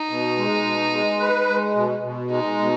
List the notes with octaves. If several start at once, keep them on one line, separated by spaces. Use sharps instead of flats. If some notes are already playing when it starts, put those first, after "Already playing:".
Already playing: D#4
B2
G#3
B2
G#3
B4
G#3
B2
B2
G#3 D#4
B2